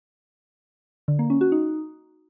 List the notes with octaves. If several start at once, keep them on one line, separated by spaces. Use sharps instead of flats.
D3
A#3
C#4
F#4
D#4